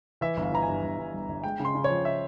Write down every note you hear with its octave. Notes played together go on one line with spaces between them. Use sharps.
E3 E5
G1
F5
E3 A#5
G#5
G2
G1
G2
G1
G1
G#3 G5
C#3
C6
C#3
C#5
F3
E5